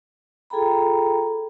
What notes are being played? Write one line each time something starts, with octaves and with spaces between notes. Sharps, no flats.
F4 G#4 A4 G5 A#5 B5